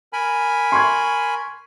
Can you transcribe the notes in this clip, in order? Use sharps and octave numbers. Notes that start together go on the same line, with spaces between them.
A#4 G#5 B5
C6 C#6 G#6